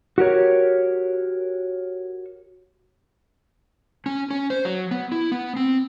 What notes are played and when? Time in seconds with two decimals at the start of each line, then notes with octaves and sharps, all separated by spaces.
0.18 F#4 G4 A#4 C#5
4.06 C#4
4.30 C#4
4.50 C5
4.65 F#3
4.91 B3
5.12 E4
5.32 B3
5.56 C4